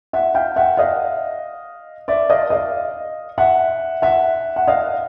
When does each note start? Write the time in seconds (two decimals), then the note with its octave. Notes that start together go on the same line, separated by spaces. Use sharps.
0.13 E5 F#5
0.35 F5 G5
0.56 E5 F#5
0.77 D#5 F5
2.08 D5 E5
2.30 D#5 F5
2.50 D#5 F5
3.38 E5 F#5
4.02 E5 F#5
4.56 F#5
4.67 D#5 F5